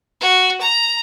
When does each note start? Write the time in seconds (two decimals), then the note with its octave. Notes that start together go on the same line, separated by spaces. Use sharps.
0.21 F#4
0.61 A#5